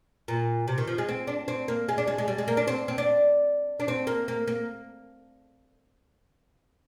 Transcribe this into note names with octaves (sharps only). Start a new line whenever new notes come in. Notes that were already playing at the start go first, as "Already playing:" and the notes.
A#2
C3
D#3
F3
G#3
C4
D4
C4
A#3
G#3
D4
G#3
G#3
G3
G#3
A#3
D4
C4
C4
D4
D4
C4
A#3
A#3
A#3